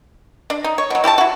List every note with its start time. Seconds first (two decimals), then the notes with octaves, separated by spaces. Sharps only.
0.50 D4
0.64 D#4
0.78 C#5
0.90 B2 F#3
1.04 E4 G4 G#4 A5
1.18 E4 F#4